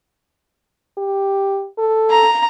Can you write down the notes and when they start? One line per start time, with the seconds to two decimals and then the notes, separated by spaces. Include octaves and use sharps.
0.98 G4
1.78 A4
2.11 A#5